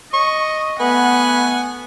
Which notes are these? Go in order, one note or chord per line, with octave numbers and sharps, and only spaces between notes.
D#5 C#6
A3 B3 B4 F#5 G#5